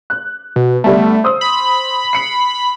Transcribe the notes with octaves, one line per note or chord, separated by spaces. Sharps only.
F#6
B2
D3 G3 A3 B3
C5 D#6 E6
B5
C7 C#7